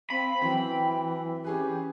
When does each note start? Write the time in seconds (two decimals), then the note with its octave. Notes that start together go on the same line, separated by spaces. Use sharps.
0.10 C4 F5 B5
0.41 E3 F#3 C4 G5
1.44 C#4 G4 G#4 B4